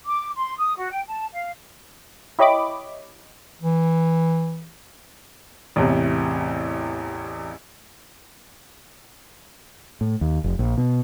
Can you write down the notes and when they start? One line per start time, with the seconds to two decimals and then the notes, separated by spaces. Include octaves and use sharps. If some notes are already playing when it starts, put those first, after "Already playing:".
0.07 D6
0.36 C6
0.58 D#6
0.76 F#4
0.90 G5
1.07 A5
1.33 F5
2.39 E4 G4 C#5 D#5 B5 D6
3.62 E3
5.76 A1 E2 C3
10.01 A2
10.21 D#2
10.44 F1
10.59 A#1
10.78 B2